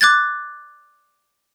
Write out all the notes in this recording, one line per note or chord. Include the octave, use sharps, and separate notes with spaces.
D6 F#6 G#6 A6